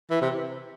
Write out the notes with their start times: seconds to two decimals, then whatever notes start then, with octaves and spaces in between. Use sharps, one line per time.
0.11 E3
0.21 C3